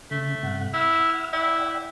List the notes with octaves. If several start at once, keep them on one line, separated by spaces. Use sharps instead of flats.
C#3 A3
G2 C3 F#5
E4 F#5 E6 F6
E4 D5 F#5 G5